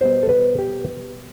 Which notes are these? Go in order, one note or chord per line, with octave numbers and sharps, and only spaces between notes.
B2 G3 B3 C5
A4
B4
G4